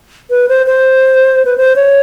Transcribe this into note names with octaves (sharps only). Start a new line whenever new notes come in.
B4
C5
C5
B4
C5
C#5